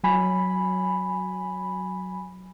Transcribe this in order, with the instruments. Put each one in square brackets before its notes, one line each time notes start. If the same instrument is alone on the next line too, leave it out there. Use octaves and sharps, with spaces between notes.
[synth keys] F#3 G#5 B5